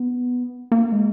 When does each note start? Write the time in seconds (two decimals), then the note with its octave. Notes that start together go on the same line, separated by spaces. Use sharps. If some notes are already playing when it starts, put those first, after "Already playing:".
Already playing: B3
0.72 A#3
0.92 G#3